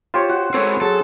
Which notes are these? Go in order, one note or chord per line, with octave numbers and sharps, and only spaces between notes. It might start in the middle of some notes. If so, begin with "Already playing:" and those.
F4 G4 C5 C#5
F#4
G#3 C4 A4 C#5
F#3 G#4 A4 A5